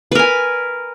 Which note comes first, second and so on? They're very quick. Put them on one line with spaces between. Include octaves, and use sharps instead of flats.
B4 A#4 G#5